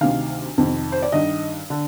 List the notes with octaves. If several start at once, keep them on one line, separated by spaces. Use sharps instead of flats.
D2 C3 D#3 F5
F2 C3 D#3
C5
D5
G2 D#3 D#5
D3